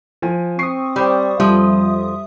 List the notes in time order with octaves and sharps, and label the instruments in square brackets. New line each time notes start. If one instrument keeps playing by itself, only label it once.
[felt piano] F3 G#5
[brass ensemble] C4 [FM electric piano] C#6 D#6 [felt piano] C7
[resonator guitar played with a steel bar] G3 [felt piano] C5 B5
[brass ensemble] F2 [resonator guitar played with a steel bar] F3 [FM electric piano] G3 E5 D#6